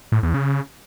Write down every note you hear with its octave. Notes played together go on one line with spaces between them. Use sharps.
A2
E2
C#3